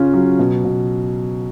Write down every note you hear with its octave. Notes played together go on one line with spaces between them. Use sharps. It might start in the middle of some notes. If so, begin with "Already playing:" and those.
Already playing: C#3 C#4 F4
F#3
B2
B2